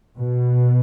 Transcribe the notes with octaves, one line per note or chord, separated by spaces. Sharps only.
B2